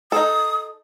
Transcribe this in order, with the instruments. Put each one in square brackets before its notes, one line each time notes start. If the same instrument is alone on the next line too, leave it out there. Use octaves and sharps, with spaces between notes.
[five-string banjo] D#4 A4 [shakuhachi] D#6